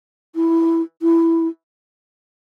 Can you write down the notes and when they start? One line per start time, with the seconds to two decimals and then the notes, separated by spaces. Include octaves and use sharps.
0.35 E4
1.02 E4